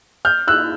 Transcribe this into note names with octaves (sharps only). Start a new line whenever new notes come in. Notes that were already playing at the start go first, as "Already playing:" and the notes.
F6 G6
E6 F#6